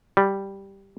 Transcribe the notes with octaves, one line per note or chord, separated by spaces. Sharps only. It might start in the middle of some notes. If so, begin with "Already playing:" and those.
G3